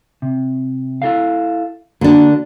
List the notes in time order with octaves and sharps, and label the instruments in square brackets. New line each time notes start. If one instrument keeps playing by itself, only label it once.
[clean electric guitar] C3
E4 A4 F5
[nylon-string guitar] D3 D4 [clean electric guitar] A#3 F#4 A4